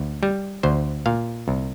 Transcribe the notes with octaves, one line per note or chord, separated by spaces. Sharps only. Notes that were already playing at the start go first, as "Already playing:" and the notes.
Already playing: D2
G3
D2 C5
A#2 F5
C2